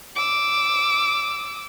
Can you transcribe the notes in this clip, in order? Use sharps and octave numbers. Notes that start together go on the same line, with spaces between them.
D6 E6